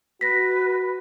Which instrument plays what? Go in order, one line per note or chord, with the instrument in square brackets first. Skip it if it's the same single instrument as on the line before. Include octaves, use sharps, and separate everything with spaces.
[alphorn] F#4 [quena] B4 [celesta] A#6 B6